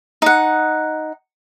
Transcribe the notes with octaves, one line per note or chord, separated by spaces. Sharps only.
D#4 F#5